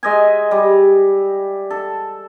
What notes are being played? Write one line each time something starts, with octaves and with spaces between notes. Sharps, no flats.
G#3 D#5 E5 G#5
G3
A4